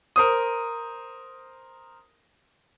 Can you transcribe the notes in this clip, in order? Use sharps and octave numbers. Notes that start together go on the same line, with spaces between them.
A#4 C5 D#6